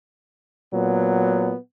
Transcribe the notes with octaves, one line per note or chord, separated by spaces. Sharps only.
A#2 F#3 B3